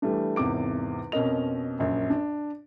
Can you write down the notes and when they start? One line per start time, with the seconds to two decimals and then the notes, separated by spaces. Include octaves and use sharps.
0.02 E3 G3 A3 D4
0.36 G#1 E2 C3 D6 D7
1.12 F2 B2 C#4 A#4 D#5 F7
1.79 A#1 F#2 A#2
2.10 D4